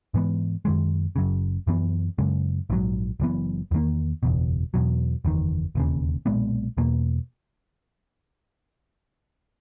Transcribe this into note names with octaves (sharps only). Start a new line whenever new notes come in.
G#2 E3 G#3 B3
F#2 D#3 G#3
F#1 F#2 C#3
F#2 E3 B3
F#2 C#3 G#3
A#1 G#2 D#3 F#3
F#1 F#2 E3 B3
E2 D#3 A#3
F#1 E2 B2
E2 B2 F#3
F#1 E2 D#3
E1 D#2 C#3
B1 A#2 G#3 B3
E2 B2 A#3